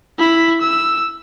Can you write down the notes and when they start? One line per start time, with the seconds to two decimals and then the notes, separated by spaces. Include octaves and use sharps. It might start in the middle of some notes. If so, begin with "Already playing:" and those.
0.19 E4 B5
0.61 E6